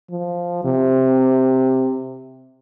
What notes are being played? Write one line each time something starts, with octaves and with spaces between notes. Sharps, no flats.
F3
C3